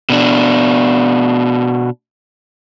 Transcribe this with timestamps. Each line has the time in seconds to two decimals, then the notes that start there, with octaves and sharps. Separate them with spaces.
0.10 B2 D4